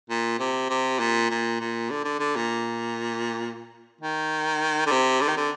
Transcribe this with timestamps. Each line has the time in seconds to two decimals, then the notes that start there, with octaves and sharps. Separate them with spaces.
0.10 A#2
0.39 C3
0.70 C3
0.99 A#2
1.30 A#2
1.60 A#2
1.90 D3
2.05 D3
2.19 D3
2.36 A#2
4.01 D#3
4.86 D3
4.91 C3
5.20 D3
5.29 D#3
5.37 D3